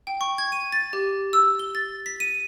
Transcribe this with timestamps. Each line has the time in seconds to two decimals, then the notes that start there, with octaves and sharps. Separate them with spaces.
0.07 G5
0.21 C#6
0.38 G#6
0.52 D#7
0.72 A6
0.93 G4
1.33 E6
1.59 G7
1.75 A6
2.06 B6
2.20 D#7